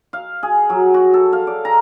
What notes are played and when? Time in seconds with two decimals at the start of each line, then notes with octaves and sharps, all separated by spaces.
0.13 F5
0.43 G#4
0.70 F#3
0.94 F#4
1.14 A4
1.33 F5
1.47 D5
1.65 A#5